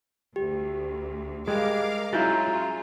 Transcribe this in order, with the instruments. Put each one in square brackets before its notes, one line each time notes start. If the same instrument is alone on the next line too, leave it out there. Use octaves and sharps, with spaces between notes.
[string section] D2 [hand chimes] G4
[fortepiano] G3 [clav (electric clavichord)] G#3 [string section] A#4 F5 D6
[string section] C#3 F4 [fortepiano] F#3 E4 F5 [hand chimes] A#5 G6 A6